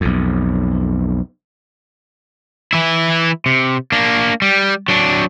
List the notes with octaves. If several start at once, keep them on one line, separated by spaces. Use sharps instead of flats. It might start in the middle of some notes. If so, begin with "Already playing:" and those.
B1 F2
E3 E4
C3
A#3 D4
G3
F#3 D4